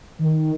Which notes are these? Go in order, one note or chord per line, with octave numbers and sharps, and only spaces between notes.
D#3